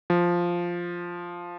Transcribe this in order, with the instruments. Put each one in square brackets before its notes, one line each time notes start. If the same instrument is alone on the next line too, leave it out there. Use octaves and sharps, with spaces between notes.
[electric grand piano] F3